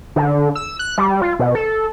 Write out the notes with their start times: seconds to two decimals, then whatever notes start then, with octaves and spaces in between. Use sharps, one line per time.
0.16 D3
0.55 E6
0.79 F#6
0.98 G3
1.22 F4
1.39 B2
1.55 A4